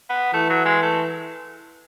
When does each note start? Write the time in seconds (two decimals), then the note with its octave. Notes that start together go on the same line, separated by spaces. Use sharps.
0.10 B3
0.34 E3 A3
0.50 F#3
0.66 G#3
0.83 A3